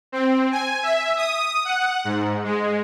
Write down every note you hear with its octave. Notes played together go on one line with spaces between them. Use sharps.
C4
G#5
E5
D#6
F#5
G#2
G#3